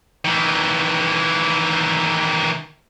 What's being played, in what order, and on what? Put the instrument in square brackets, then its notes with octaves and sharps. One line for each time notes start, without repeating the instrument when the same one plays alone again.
[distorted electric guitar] D#3 E3